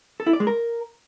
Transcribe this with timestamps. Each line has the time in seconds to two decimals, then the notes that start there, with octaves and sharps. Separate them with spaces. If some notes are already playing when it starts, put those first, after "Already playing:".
0.20 A4
0.27 E4
0.33 D5
0.40 G#3
0.47 A#4